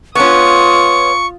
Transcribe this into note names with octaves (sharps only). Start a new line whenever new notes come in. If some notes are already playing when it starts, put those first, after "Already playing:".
B3 C#4 F4 C#6 D#6